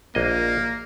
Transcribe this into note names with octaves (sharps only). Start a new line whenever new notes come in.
A#1 A#3 D#5